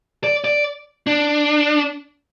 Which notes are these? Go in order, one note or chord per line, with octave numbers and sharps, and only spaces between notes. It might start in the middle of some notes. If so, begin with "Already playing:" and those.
D5
D5
D4